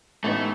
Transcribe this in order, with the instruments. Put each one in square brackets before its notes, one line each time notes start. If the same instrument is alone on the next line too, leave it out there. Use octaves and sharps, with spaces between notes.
[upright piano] A1 A2 G#3 B3 D#4 [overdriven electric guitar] A3